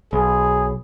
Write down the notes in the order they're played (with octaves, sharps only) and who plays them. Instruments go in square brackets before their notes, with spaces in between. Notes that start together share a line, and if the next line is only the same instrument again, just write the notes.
[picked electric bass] B1 [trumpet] G#4